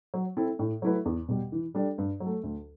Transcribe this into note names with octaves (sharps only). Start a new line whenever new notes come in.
F#3
C4 E4 A4
A2
F#3 A3 E4 B4
E2
B2 G3
E3
G3 D4 A4
G2
F#3
A3
D2